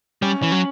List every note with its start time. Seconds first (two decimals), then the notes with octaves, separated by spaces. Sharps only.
0.22 G3 C#4
0.42 E3 C#4
0.52 F#3